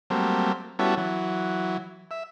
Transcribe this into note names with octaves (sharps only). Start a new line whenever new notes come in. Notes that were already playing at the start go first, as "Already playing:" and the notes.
F#3 G3 A3 A#3 C4
G3 B3 C#4 E4 F#4 A4
E3 F#3
E5